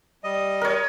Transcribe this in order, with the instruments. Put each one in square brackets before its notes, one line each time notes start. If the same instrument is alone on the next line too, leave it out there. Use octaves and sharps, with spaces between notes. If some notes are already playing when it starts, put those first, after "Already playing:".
[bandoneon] G3 D#5
[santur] A#4 C#5